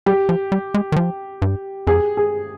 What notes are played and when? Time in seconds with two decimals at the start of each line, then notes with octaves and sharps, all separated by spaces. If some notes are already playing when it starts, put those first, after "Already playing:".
0.06 G3 G4
0.29 F3
0.52 G3
0.74 G#3
0.92 D#3
0.96 F3
1.42 G2
1.87 F2 G#4
2.17 G#4